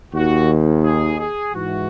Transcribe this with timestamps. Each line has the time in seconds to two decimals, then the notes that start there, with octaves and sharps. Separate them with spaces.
0.14 D#2 D#3 F#4
0.84 G#4
1.19 G#4
1.53 G#2 E3 F#4